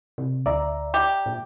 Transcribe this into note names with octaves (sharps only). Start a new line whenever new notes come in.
C3
D2 D5 E5 A#5
G4
A#2